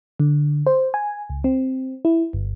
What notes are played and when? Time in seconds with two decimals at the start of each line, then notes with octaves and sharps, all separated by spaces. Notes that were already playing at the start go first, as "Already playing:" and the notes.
0.20 D3
0.66 C5
0.94 G#5
1.30 C#2
1.44 C4
2.05 E4
2.33 G1